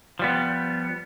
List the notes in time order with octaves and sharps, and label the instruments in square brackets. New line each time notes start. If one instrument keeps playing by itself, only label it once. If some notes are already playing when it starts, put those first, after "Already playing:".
[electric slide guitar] F3 G3 B3